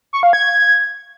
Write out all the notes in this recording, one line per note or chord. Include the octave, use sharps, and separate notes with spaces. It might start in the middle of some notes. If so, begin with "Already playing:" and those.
C#6
F5
G#6